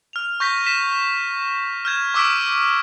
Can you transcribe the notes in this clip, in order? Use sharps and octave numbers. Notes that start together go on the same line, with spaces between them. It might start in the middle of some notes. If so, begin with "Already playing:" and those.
F6 F7
C#6 G6 A#6 B6
B6 E7
F6 G6 G#6 E7
C#6 D6 E6 F6 B6 D7